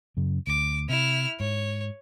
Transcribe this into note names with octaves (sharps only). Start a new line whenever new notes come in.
F#2 C#3
D2 D6
C3 E4 F6
G#2 C#5